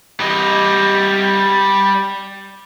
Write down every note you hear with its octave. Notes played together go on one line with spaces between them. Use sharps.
G3 D#5